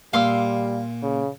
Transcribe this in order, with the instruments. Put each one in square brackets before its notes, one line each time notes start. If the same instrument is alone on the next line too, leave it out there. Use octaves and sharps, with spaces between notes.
[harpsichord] A#2 [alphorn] G3 [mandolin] F5 C6 E6
[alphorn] C#3